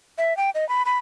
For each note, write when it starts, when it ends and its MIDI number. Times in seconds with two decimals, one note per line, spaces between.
0.18 0.36 76
0.37 0.50 79
0.55 0.67 75
0.69 0.83 83
0.86 0.98 83